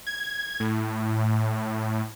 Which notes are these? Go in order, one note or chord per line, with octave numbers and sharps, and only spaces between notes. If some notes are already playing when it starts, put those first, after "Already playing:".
G#6
A2